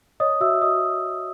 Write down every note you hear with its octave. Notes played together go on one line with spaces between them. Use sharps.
C#5 D#5 D#6
F#4 E5 E6
F#4 D#5 D#6